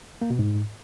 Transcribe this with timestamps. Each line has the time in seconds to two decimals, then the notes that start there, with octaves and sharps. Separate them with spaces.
0.22 A#3
0.30 B2
0.39 G#2